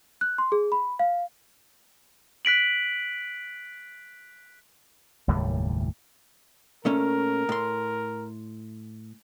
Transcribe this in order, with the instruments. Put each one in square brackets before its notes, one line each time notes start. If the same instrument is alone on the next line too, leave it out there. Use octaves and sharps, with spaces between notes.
[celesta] F#6
C6
G#4
B5
F5
[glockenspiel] F#6 B6 D7 F#7
[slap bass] F#1 D#2 A2 G3
[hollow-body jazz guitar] A#2 A3 C#4 [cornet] A#4
[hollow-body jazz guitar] A2 C6